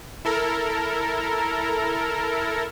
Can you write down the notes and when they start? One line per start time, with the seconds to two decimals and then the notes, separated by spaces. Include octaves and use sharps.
0.25 E4 A4 A#4